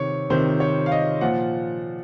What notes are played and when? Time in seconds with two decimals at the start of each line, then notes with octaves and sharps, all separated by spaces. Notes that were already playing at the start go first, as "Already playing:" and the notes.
Already playing: C3 D#3 C#5
0.30 C3 D#3 C5
0.60 C#5
0.86 F5
0.92 D#5
1.21 A#2 F3 F#5